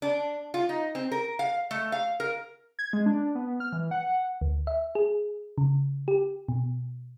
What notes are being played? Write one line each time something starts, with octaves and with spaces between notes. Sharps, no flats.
D4
F4
D#4
C4
A#4
F5
A3
F5
A#4
G#6
G#3
D4
B3
F6
E3
F#5
D2
E5
G#4
C#3
G4
B2